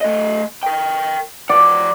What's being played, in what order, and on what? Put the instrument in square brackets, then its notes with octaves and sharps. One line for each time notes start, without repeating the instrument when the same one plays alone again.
[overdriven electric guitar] A3 D#5
A#4 G5
[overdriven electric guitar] F3 F#5 [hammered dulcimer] D5